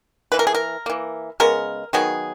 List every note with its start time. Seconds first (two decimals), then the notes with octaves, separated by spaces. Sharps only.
0.32 E3 A#3 B4
0.39 A#4
0.47 G#4
0.54 A#4
0.86 E3 A#3
1.40 C#3 G#3 B3 A#4
1.93 D#3 F#3 B3 G#4